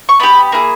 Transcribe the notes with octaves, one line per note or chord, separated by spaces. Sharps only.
C#6
B3 G4 B5
A#3 E4 G#4